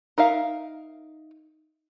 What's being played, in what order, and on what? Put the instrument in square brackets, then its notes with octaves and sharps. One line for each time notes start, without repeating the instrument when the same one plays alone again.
[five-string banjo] D#4 A#4 E5 F5